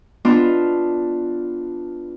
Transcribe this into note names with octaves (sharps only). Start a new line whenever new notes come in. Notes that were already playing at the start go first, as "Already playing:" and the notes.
B3 D4 F4